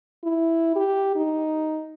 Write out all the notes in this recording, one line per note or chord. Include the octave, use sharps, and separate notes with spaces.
E4
G4
D#4